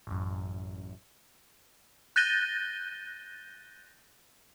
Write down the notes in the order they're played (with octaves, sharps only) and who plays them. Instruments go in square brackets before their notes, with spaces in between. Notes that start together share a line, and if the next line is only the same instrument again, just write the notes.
[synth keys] A1 F#2
[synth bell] F#6 G6 A6 A#6 D#7 G7